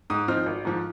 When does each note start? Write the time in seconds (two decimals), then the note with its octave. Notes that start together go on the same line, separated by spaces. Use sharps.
0.10 G#2 D#6
0.28 F3 C4 D#4 F6
0.46 G#1
0.65 G#2 F3